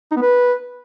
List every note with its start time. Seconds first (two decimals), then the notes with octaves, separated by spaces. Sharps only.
0.11 D#4
0.17 B3
0.22 B4